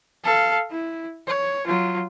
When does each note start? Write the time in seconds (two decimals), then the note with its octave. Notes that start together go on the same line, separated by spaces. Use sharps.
0.24 A4 F5
0.71 E4
1.27 C#5
1.67 F#3 F4